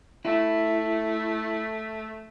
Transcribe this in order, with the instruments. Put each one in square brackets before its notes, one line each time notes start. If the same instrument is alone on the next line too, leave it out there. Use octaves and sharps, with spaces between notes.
[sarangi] A3 [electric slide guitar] E4